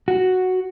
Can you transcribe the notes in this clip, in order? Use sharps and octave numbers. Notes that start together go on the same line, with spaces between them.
F#4